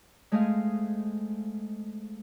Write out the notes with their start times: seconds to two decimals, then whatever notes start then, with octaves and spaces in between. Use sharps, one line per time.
0.32 G#3 A3 C4 G#4 D#5 F5